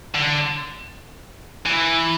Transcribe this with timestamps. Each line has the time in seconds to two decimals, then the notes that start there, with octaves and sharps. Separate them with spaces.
0.15 D3
1.66 E3